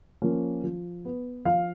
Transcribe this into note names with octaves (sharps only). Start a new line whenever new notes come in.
F3 A#3 C#4
F3
B3
F3 F5